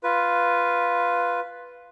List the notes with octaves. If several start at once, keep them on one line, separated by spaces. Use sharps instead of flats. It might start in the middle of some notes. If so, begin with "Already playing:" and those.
F4 B4